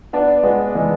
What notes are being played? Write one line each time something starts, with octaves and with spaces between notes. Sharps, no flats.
B3 D4
G#3 B3
E3 G#3